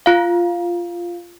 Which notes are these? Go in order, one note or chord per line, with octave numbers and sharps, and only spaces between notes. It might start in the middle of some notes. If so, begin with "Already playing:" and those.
F4 F5